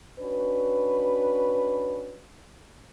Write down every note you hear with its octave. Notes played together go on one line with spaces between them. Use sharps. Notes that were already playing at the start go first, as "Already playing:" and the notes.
C#4 D4 F#4 B4